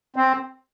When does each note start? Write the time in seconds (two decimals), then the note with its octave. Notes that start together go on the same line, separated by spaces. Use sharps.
0.16 C4